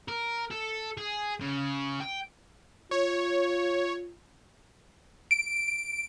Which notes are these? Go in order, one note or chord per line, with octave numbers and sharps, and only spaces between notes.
A#4
A4
G#4
C#3
G5
F4 C#5
D7